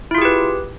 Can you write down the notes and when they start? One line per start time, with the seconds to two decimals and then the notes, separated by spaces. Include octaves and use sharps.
0.11 E4
0.15 F4
0.18 G#4
0.22 G4
0.25 B4